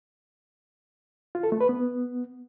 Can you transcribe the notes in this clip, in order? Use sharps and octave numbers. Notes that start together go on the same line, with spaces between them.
F4
A4
A3
B4
B3